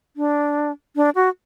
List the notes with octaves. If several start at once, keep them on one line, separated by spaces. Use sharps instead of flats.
D4
D4
F#4